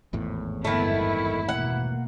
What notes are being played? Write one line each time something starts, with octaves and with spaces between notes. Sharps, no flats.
G#1 E2 A2
G1 D#3 A3 B3 E4
B2 A#3 F#5